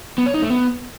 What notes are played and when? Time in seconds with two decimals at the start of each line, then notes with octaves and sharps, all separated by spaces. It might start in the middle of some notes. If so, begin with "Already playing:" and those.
0.18 B3
0.26 C#5
0.34 D#4
0.42 A3
0.50 B3